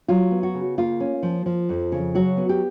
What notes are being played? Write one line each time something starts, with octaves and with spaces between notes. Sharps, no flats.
F#3 F4
B3
F#4
C#3
A#3 F4
C#4
F3
F3
F2
C#3
F#3 F#4
B3
G4